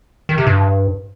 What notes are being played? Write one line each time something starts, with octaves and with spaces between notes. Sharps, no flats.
D#3
C3
G2